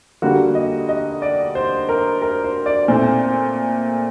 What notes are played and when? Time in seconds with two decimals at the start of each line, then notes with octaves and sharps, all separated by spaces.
0.22 D3 G3 A#3 F#4
0.55 D#5
0.89 D#5
1.22 D5
1.55 C5
1.89 A#4
2.22 A#4
2.44 C5
2.66 D5
2.88 A#2 A3 C4 C5